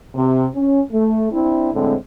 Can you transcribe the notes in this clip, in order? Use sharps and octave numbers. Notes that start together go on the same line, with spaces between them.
C3
C#4
A3
C4 D4 E4
A2 D3 G#3 C4